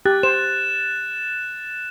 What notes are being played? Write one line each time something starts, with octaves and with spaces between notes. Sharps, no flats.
G4 F#6 A6
C5 E7